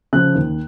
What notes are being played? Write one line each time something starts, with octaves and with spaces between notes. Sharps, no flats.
C#3 F3 F#6
D#2